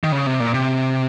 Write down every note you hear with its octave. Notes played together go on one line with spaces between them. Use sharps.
D#3
C#3
C3
A#2
C3